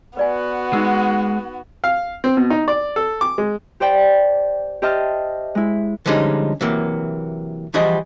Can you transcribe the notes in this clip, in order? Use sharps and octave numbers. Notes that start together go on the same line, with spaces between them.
B3 F#4 B4 D5 G#5
G#3 D#4 E6
F5
C4
B2
D#4
D5
A4
D6
G#3
G4 C5 D5 G5 A5
G4 C5 D#5 E5 A5 F6
G#3 E4
D3 F3 G3 G#3 C#4 D#4
C3 E3 F#3 A#3
E3 F3 G3 F#4 G#4 D#5